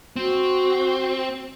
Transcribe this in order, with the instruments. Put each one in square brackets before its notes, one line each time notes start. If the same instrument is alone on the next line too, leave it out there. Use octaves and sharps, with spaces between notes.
[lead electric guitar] C4 [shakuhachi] F#4